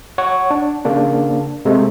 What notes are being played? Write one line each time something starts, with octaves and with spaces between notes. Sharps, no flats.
C#5 F#5 C#6
D4
C#3 A#3 D4
C3 G#3 A3